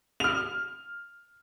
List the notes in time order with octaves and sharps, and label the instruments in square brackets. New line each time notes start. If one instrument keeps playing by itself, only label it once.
[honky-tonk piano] F6 F7